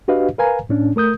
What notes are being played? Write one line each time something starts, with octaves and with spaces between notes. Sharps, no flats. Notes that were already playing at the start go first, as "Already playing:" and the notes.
D4 F#4 G4 B4 D#5 F5
A#4 B4 F5 G#5 A#5
A2 C#4 D4
A3 A#4 D#6 G6